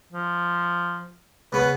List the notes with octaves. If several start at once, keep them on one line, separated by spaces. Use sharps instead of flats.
F3
C#3 B3 B4